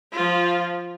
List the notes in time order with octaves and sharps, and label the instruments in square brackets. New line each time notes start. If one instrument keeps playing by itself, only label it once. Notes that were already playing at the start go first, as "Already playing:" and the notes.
[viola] F3 F4